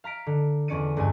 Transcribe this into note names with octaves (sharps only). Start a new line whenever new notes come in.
F5 A#5 B6 D7
D3
E2 D3 C#4 D5 C#7 D#7
C#2 G2 G#5